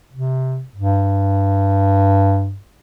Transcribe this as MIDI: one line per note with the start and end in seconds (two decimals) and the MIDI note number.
0.12 0.62 48
0.76 2.57 43